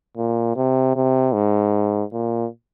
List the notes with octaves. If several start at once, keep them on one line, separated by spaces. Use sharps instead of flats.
A#2
C3
C3
G#2
A#2